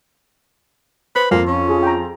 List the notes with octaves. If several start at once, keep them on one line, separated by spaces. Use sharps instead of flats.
B4 C5
F2 A#3
C#4
F4 G#4
G5 A#5